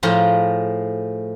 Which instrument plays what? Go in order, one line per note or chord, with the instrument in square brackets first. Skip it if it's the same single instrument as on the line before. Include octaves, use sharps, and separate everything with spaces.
[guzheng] A2 F3 G#4 F5 A#5 C6